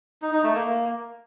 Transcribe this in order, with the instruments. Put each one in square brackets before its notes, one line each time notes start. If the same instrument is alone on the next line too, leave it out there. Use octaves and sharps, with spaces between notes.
[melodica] D#4
D#4
A3
A#3